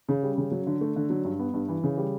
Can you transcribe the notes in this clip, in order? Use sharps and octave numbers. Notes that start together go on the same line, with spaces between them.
C#3
G3
C#3
F#3
D3
A3
D3
F#3
G2
B3
G2
E3
C#3
G3